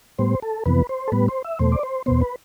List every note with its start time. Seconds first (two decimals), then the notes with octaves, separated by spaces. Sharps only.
0.19 A2 G3 B3 C5
0.42 A4
0.66 F2 C3 E3 B3 B4
0.89 C5
1.08 A4
1.12 A2 G3 B3 B4
1.28 C5
1.44 E5
1.59 E2 B2 A3 C5
1.72 D5
1.83 C5
2.06 E2 B2 B3 C5
2.22 B4